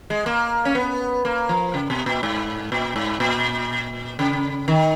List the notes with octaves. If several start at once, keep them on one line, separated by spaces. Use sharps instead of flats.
G#3
A#3
C#4
B3
A#3
F3
C#3
B2
A#2
G#2
A#2
G#2
A#2
C#3
D#3